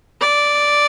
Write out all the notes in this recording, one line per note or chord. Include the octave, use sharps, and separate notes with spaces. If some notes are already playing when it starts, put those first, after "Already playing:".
D5